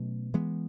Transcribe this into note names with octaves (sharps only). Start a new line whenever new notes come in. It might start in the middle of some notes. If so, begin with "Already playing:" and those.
Already playing: B2 F#3 A3 C#4
E3 G#3 B3